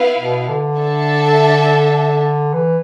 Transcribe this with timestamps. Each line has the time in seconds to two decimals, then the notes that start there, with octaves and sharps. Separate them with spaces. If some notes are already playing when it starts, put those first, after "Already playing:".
Already playing: B3 E4 B4 F5
0.19 B2
0.49 D3
0.78 D4 A4 E5 A5
2.53 E3